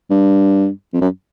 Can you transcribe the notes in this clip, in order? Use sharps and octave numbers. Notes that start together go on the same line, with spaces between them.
G2
F2
F#2